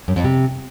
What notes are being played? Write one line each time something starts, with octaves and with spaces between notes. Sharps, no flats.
F#2
F2
C3